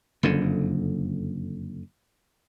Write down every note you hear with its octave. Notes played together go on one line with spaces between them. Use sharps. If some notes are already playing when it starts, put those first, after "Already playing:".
F#1 F2 D3